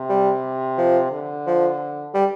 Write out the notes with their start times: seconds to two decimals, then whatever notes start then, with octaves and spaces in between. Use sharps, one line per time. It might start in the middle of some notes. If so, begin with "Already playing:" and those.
Already playing: C3
0.10 G3
0.78 F3
1.11 D3
1.47 F3
2.14 G3